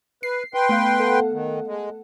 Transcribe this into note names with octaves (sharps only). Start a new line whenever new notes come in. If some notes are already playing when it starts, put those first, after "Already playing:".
B4 C7
B4 G5 C6
A3 B3 F5
A4 F#5
D#3
G#3